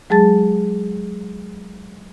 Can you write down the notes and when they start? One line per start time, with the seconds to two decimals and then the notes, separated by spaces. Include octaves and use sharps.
0.10 F#3 G#3 G#4 A5 A6